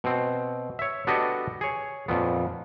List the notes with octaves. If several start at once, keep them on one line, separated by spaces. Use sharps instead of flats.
B2 C4
C#5 E5
B3 D4 F#4 G4 A4 D#5
G#4 C#5
F2 A#2 B3